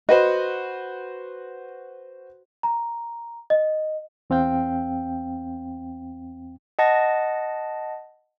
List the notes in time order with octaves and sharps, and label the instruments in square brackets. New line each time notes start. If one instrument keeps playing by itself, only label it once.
[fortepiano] F#4 B4 C5 [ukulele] D#5
[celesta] A#5
D#5
[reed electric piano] E2 C4 F5 G5
[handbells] D#5 F#5 A5 A#6